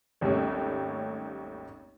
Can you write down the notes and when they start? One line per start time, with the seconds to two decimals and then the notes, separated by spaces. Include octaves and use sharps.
0.21 G#1 D#2 G3 A3 C#4